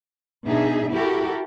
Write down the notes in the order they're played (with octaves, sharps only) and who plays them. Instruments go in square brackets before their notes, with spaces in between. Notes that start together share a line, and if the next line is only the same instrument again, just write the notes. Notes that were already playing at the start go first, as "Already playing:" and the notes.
[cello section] B2 D4 D#4 G#4 E5
E4 F#4 G4 A4 A#4